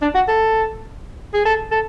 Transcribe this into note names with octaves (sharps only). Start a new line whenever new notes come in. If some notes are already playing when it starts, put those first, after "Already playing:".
D4
F#4
A4
G#4
A4
A4